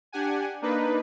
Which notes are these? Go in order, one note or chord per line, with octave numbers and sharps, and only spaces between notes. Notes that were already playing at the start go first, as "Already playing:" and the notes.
D4 G4 F#5 G#5
A#3 D4 D#4 B4